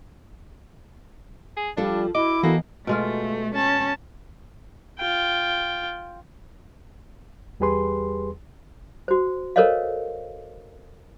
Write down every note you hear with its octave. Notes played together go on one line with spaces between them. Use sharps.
G#4
F3 G3 D4 F4 A4
E4 F#4 D#5 D6
E3 A#3 B3 F#4 A4
B2 G#3 A3 F4
C#4 A5
F4 G5
E2 G3 G4 G#4 B4 C6
F#4 C5
A4 A#4 C5 C#5 D#5 F5